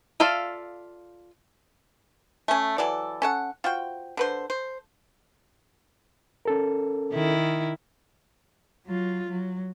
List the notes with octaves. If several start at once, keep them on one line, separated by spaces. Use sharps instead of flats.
F4 A4 D5 E5 F5
A3 C#4
E3 F#3 A4 D5
C#4 A4 F#5
F4 F#4 C5 G5
D3 B4 C5
C5
C#4 A4 A#4
D#3 E4
F#3 F4
F#3